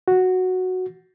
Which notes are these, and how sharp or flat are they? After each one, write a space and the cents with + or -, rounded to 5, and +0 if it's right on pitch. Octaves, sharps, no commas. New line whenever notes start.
F#4 -5